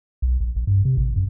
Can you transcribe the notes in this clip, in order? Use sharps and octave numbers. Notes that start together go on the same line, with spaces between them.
B1
A#1
A#1
G2
C3
A1
F#2